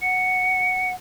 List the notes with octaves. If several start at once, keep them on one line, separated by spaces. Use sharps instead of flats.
F#5 C#7